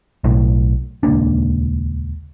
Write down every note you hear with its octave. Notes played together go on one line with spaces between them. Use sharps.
B1 A2
D#1 C#2 A#3 D4